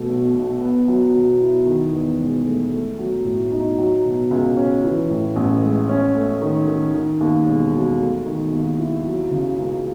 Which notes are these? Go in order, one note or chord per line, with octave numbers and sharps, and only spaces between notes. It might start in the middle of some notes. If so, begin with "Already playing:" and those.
Already playing: B2 A3
B1
B1
B3
F#3
B2
E4
D#3
E2
E1
A3
A3
F#3
A2
D#4
F#3
B2
C#2
C#4
E3
A2
A1
G#3
C#4
A3
D#3
D#3
D#3
D#2
E1
F#3
A3
D#3
D#2
E4
F#3
C#3
C#2